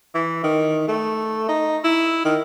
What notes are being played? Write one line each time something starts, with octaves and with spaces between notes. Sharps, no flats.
E3
D#3
A3
D#4
E4
D#3